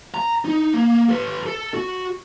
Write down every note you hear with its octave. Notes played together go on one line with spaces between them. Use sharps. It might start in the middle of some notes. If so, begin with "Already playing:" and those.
A#5
D#4
A#3
A4 B4
A4
F#4